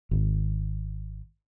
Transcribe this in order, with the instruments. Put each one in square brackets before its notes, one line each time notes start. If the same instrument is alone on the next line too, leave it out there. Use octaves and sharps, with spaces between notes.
[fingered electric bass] G#1